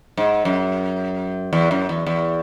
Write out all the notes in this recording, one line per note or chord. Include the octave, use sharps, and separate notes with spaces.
G#2
F#2
E2
F#2
E2
E2